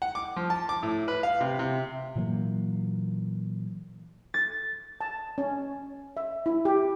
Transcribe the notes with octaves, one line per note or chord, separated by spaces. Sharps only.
F#5
D6
F3
A5
D6
A2
B4
F5
C3
C3
A#2 E3 F#3 A#3
A6
A5
C#4
E5
E4
G4